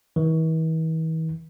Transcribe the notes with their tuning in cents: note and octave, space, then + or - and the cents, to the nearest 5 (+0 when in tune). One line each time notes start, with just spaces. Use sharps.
E3 -45